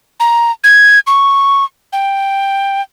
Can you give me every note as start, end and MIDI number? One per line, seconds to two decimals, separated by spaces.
0.20 0.51 82
0.64 0.99 92
1.07 1.65 85
1.93 2.82 79